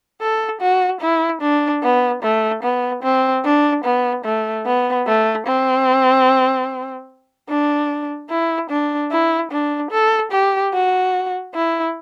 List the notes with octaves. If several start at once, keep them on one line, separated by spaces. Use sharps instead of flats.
A4
F#4
E4
D4
B3
A3
B3
C4
D4
B3
A3
B3
A3
C4
D4
E4
D4
E4
D4
A4
G4
F#4
E4